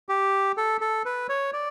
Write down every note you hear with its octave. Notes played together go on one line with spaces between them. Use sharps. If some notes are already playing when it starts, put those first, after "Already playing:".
G4
A4
A4
B4
C#5
D5